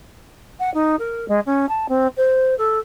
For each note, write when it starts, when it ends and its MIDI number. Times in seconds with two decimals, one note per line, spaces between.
0.59 0.72 78
0.74 0.95 63
0.99 1.28 70
1.28 1.40 56
1.46 1.65 61
1.68 1.86 81
1.88 2.07 60
2.17 2.54 72
2.58 2.79 69